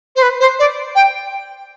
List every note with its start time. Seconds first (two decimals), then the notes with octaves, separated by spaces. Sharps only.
0.16 C5
0.22 B4
0.40 C5
0.59 D5
0.96 G5